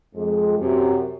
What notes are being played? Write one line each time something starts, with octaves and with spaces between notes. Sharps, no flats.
F2 G#3
F#2 C3